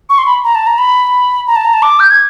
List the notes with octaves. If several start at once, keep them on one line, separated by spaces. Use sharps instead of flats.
C#6
C6
B5
A#5
A5
A#5
B5
A#5
A5
A#5
A5
D6
G6
G#6